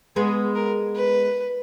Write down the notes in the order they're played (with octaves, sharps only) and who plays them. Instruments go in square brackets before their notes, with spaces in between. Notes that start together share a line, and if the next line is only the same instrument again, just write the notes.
[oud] G#3 B3 [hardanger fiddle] G#4
[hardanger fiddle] A#4
B4